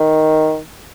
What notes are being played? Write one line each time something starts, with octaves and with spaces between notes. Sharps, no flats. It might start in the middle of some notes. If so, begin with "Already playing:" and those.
Already playing: D#3